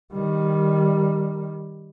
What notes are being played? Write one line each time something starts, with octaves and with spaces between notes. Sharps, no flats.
D#3 G3